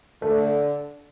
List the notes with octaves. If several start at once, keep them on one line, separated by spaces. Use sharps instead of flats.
D3 A3